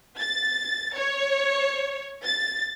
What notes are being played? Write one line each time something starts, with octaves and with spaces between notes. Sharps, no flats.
A6
C#5
A6